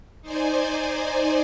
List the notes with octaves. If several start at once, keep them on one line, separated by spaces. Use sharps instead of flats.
D#4 C5 D5 G#5